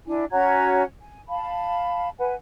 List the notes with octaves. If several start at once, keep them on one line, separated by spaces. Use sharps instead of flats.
D4 E4 G#5
C#4 F#4 A#5 G#6
G#5
F5 A5 B5
B4 F#5 G#5